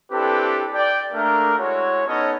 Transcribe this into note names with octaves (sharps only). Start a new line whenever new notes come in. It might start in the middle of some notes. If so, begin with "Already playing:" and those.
C4 D4 E4 G4 A4 B4
D5 G5
A3 A#3 D4 A#4
G#3 E4 F#4 C#5
B3 C#4 D#4 A4 C#5 D#5